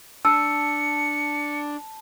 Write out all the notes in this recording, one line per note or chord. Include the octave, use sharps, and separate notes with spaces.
D4 A5 E6 C#7